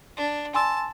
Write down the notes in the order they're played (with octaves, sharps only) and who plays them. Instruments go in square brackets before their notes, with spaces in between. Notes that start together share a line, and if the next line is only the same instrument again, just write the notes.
[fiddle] D4
[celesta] G#5 C6 E6 [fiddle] A5